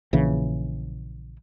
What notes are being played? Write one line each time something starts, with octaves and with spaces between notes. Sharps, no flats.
A#1 C#3 E3